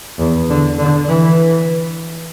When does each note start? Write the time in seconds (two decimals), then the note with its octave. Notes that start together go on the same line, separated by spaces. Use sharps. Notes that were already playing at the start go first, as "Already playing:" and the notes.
0.19 E2
0.49 D3
0.78 D3
1.07 E3